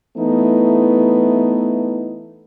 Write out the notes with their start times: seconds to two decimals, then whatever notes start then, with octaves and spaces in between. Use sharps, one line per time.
0.17 E3 A3 B3 D#4 E4